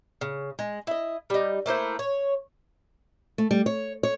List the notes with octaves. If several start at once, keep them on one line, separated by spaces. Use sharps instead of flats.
C#3
G#3
E4 D#5
G3 D#4
A3 A#3 E4 C5
C#5
A3
G3
C#5
C#5